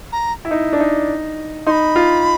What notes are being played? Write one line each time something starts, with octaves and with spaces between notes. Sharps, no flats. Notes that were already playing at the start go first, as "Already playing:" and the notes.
A#5
E4
D#4
D4
D#4
D#4 B5 C6
F4